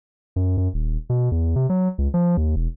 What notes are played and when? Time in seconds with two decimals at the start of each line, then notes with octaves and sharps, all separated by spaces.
0.36 F#2
0.57 F#2
0.74 D#1
1.10 B2
1.32 E2
1.56 C3
1.69 F#3
1.98 C#2
2.14 F3
2.37 D#2
2.56 E1